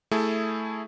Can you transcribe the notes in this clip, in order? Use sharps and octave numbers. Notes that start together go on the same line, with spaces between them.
A3 E4 G#4 A4